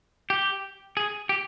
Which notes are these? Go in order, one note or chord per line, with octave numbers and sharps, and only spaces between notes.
G4
G#4
G4